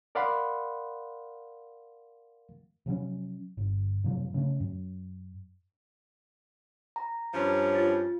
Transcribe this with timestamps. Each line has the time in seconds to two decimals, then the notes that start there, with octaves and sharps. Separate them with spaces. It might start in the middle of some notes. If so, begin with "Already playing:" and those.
0.15 A#4 D5 F5 F#5 B5 C6
2.86 C3 F3 F#3 C#4
3.57 G1
4.04 F#2 C3 F3 F#3
4.34 C#3 A3 C#4
4.60 F#2
6.96 A#5
7.34 G2 F3 C#4
7.75 F4 A6